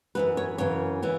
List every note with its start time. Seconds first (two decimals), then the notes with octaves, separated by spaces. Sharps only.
0.15 F#2 E3 B3 B4
0.37 C#5
0.58 F#2 C#3 E3 C#5
1.03 E3 B3